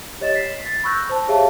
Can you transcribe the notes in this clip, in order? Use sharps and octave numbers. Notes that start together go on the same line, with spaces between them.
G4 C#5 D#5 A6 E7
B6 C7
A6
B5 C#6 E6 F#6 G6 A#6
C5 A5
G4 G#4 C#5 E5 F5 A5